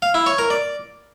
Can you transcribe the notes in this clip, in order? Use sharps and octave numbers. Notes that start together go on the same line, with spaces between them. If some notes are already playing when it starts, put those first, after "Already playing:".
F5
E4
C#5
A#4
D5